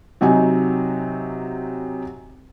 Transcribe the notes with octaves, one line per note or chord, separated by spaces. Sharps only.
C3 F#3 D#4 G#5